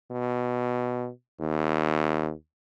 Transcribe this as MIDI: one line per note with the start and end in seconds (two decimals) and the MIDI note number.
0.11 1.10 47
1.40 2.33 39